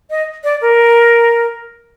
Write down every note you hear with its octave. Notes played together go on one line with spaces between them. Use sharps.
D#5
D5
A#4